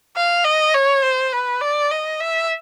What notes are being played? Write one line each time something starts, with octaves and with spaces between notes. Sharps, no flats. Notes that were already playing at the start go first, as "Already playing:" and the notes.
F5
D#5
C#5
C5
B4
D5
D#5
E5